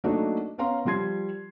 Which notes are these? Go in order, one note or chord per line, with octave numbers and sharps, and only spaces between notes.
F#3 A3 A#3 D4 D#4
B3 C#4 F5 A#5 C6
F3 G3 C6 G#6 C7